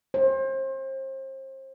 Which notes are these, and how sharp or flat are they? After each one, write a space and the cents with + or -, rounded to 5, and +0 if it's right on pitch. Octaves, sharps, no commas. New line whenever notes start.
C5 +35